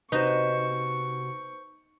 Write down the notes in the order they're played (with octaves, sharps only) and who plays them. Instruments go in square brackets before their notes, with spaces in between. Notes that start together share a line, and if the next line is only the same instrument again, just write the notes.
[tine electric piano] C3 F#4 A#6 [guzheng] D#4 [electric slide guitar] B4 C5 [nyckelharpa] C#6